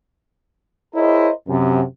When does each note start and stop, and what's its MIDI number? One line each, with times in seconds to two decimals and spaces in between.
0.95 1.31 64
0.95 1.31 68
0.95 1.31 70
0.95 1.31 72
0.95 1.31 73
0.95 1.31 75
1.49 1.82 42
1.49 1.82 48